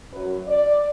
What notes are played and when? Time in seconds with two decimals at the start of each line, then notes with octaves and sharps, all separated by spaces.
0.12 F#2 F#3 B4
0.48 D5